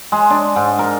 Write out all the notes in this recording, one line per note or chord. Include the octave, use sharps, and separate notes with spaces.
G#3
D4
G#2
A#4